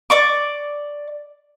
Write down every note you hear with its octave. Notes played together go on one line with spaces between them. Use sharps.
D5 C#6 D6